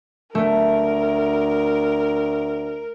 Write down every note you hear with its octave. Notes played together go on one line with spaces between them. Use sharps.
D2 A3 A#4